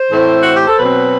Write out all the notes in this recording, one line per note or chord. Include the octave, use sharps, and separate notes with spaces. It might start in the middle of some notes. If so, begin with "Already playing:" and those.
Already playing: C5
A2 E3 A3 C4 E4
F#4
G4
A4
B2 F#3 C4 B4